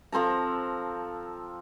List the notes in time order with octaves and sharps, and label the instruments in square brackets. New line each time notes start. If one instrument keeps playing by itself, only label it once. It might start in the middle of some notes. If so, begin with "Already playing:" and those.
[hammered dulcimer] F3 C4 A4 A#5